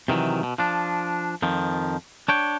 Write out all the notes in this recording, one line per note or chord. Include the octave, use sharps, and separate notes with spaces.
C3 D#3 E3 F#3
B2
F3 D4
F2 D#3 F3
D4 C#5 G5